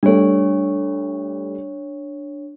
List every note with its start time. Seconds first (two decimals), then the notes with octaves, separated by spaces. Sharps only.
0.03 G3 A3 D4 C#5